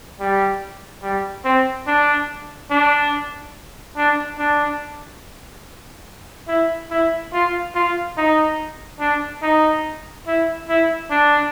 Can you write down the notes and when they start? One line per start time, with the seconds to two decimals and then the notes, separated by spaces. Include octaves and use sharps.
0.20 G3
1.02 G3
1.44 C4
1.87 D4
2.70 D4
3.97 D4
4.38 D4
6.48 E4
6.90 E4
7.33 F4
7.75 F4
8.17 D#4
9.00 D4
9.42 D#4
10.27 E4
10.69 E4
11.11 D4